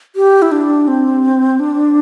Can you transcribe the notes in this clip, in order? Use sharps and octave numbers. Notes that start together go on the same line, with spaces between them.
G4
E4
D4
C4
D4